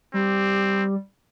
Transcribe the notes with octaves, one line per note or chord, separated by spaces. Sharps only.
G3 C4 G4